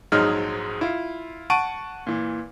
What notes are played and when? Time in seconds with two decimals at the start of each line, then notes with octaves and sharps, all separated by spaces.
0.12 A#1 G#2 F#3 G#3 D#4 F6
0.81 E4 F4
1.50 F#5 A5 C#6 D7 D#7
2.07 A#2 E3